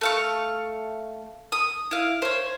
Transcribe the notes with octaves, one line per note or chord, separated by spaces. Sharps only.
A3 F5 C#6
D#6
E4 F5
C5 C#5